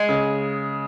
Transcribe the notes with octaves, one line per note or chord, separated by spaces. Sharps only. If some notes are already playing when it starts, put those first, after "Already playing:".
Already playing: G#3
C#3